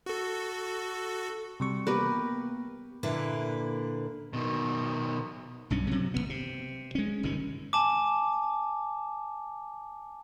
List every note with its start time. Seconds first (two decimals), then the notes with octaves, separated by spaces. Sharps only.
0.06 F#4 A4
1.60 C3 G3 C#6
1.87 A#3 B3 G4 A#4 B4
3.03 A#2 D3 A#3 E4 B4
4.33 B2 D#3
5.70 B1 G2 C#4
5.87 C3 F#3
6.14 G#1 G#2 B3
6.29 C3
6.95 G#3 C#4
7.23 G1 C3 D#3 C#4
7.73 G#5 A5 D6